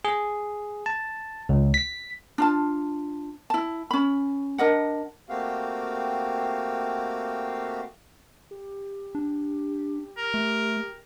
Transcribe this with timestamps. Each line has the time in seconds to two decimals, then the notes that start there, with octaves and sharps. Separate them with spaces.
0.05 G#4
0.86 A5
1.49 C#2
1.74 B6
2.38 D4 F4 A5
3.50 E4 A5
3.91 C#4 B5
4.58 D4 A#4 D#5 F#5
5.29 A3 A#3 C4 F#4 G4 F5
8.51 G4
9.15 D4
10.17 A#4
10.34 A3